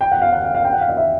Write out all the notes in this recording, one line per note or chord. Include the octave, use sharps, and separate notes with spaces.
G5
F#5
F5
F#5
F5
F5
G5
F#5
F5
D#5
E5